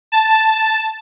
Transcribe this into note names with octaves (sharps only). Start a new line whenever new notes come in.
A5